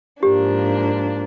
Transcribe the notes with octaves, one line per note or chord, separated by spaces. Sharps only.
G#2 F3 A#3 D4 G4